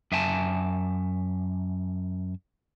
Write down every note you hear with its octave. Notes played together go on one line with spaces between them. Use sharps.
F#2 E5 G#5 A5